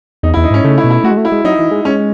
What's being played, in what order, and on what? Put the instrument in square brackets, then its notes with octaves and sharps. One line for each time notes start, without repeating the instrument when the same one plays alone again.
[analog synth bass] E2 [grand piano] D#4
[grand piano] E4
[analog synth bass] E2
[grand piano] D#4
[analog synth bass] G#2 [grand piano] C#4
[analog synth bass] C#3 [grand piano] A3
[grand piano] E4
[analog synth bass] B2
[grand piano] E4
[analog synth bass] A3 [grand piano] F#4
[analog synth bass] G#3
A3
[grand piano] E4
[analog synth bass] G#3
[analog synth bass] F#3 [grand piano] D#4
[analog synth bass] E3
G#3
[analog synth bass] G#3 [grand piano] C#4